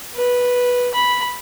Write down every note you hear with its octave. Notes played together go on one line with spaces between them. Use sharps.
B4
B5